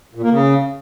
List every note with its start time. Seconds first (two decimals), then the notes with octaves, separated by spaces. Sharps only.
0.15 A#2
0.23 A#3
0.31 C#3